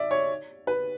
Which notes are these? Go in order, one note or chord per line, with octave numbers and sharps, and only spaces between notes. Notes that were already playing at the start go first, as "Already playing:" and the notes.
Already playing: D5 E5
C#5
B4